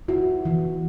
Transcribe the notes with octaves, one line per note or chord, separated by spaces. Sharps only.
E4 F#4
E3